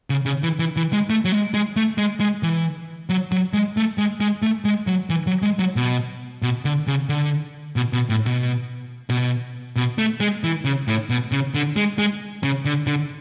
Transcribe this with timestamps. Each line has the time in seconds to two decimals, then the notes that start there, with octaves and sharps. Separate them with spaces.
0.10 C#3
0.26 C#3
0.43 E3
0.59 E3
0.77 E3
0.93 G#3
1.10 A3
1.25 F#3
1.32 G#3
1.54 G#3
1.76 A3
1.98 G#3
2.20 G#3
2.43 E3
3.10 F#3
3.32 F#3
3.54 G#3
3.77 A3
3.98 G#3
4.20 G#3
4.42 A3
4.65 G#3
4.87 F#3
5.10 E3
5.27 F#3
5.42 G#3
5.59 F#3
5.76 B2
6.42 B2
6.65 D3
6.87 C#3
7.09 D3
7.76 B2
7.93 B2
8.10 A2
8.26 B2
9.10 B2
9.76 B2
9.98 A3
10.20 G#3
10.44 E3
10.65 C#3
10.88 A2
11.10 B2
11.32 C#3
11.55 D3
11.76 G#3
11.98 G#3
12.43 C#3
12.65 D3
12.87 D3